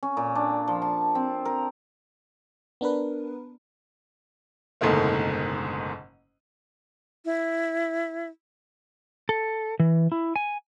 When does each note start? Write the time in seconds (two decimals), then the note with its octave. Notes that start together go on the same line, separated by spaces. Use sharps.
0.03 C#4
0.17 A#2
0.35 D4
0.68 F3
0.82 A5
1.15 C4
1.45 A#4
2.81 B3 D4 A#4 B4
4.81 F#1 G#2 B2 D3 A3 A#3
7.25 E4
9.29 A4
9.80 E3
10.12 E4
10.36 G#5